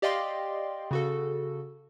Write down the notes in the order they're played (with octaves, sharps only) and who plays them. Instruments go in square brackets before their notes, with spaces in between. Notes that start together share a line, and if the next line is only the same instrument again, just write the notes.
[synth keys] G4 D5 D#5 F5 G5 C6
C#3 F#4 A4